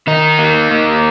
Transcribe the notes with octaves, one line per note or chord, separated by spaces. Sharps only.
D#3 D#4
A#3
A#3